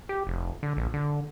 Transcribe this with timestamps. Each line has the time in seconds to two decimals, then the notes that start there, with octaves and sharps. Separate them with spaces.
0.09 G4
0.27 F1
0.63 D3
0.77 A#1
0.94 D3